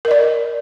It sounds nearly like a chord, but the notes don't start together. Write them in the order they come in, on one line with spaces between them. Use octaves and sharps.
A#4 D#5 D5